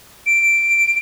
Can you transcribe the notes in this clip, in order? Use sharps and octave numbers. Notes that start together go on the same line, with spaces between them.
D7